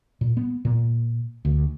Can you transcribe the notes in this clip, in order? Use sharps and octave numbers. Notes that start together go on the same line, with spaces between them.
A#2
B3
A#2
D2